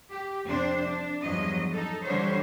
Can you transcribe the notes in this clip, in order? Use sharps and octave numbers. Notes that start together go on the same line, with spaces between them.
G4
F2 C3 C4 D4 C5
D4
E2 G2 F3 F#3 D#5
D#4 A4
D3 E3 F#3 G3 C5 C#5